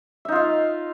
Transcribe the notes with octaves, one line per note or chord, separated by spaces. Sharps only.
D#4 F4 E5 F5